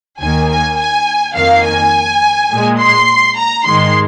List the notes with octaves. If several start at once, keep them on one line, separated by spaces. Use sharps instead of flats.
D#2 D#3 A#3 G#5
G#5
G#5
F2 D#3 A#3 F5
G#5
A#2 G#3
C6
A#5
G#2 D#3 G#3 C6